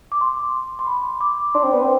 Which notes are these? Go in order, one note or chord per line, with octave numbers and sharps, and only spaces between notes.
D6
C6
C6
B5
D6
D4 C6
C4
B3
C4